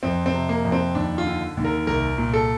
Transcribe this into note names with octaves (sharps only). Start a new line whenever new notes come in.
F2 C4
C4
C3
A#3
F2
C4
D#2 D4
F4
D3
D#2
A#4
C2 A#4
A#2
A4